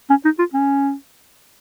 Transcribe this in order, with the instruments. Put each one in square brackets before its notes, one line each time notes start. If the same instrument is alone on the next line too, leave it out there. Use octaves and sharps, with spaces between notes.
[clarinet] C#4
D#4
F4
C#4